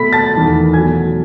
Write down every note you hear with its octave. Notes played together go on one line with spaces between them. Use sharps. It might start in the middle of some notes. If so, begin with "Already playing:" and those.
Already playing: B2 A3 B5 B6
A5 A6
E2 D#3 A3
B2 F#3 A3 G#5 G#6